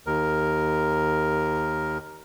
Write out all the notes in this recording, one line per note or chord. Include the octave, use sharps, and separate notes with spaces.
D#2 A#4